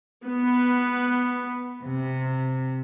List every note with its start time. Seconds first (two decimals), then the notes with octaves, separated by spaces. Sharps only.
0.23 B3
1.84 C3